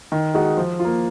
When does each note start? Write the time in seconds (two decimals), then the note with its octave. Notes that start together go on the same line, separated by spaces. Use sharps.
0.12 D#3
0.34 G#3 D#4 F#4
0.57 F3
0.80 F4
0.85 A#3